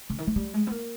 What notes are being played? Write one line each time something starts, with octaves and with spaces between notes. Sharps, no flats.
C#3
D#3
E3
G3
G#3
B3
A#3